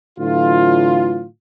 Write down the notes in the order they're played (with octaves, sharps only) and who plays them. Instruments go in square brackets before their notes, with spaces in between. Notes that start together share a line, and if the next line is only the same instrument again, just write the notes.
[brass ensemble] A2 D3 E3 F#3 F4